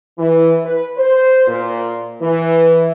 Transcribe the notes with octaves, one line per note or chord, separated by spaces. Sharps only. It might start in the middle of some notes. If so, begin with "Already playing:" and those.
E3
B4
C5
A#2
E3